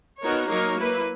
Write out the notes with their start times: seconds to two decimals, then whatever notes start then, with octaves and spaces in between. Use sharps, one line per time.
0.21 B3 D#4 F#4 A#4 C#5
0.49 F#3 A#3 D#4 A#4 C#5
0.78 A#3 E4 B4